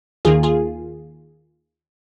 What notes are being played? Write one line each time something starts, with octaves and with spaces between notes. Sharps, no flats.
D#2 D#3 A#3 F4 G#4
F4 G#4